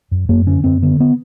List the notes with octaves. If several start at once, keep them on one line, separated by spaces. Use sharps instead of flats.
F#2
F#2 A#3
D3 C#4
F#2 C4
D3 B3
B3